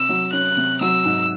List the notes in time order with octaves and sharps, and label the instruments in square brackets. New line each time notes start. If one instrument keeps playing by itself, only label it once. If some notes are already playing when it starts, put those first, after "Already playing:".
Already playing: [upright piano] C3 [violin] E6
[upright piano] F#3
[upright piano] C#4 [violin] F#6
[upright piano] C3
[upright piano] F#3 [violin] E6
[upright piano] G#2